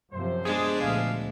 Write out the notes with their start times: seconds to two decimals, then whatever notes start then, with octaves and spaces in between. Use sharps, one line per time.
0.13 F#2 C3 F3 C5
0.45 G#3 B3 D4 G#4
0.81 D2 A#2 F3 F5